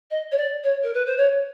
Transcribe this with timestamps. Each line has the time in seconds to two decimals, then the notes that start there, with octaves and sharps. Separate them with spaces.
0.11 D#5
0.32 C#5
0.37 D5
0.64 C#5
0.83 A#4
0.94 B4
1.06 C5
1.17 C#5